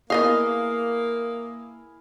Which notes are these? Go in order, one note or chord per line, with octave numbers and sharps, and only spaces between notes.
A#3 B3 E4 G#4 A#4 D#5 F5 D#6